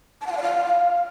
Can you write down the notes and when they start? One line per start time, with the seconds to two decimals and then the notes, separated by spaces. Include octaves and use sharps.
0.21 A5
0.26 F#5
0.32 F5
0.37 D5
0.42 F5